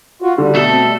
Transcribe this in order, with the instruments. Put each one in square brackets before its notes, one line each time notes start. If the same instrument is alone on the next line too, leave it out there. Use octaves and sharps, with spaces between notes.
[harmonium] F4 F#4
[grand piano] D3 [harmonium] G3
[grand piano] B2 [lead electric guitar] A3 A4
[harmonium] C4
G3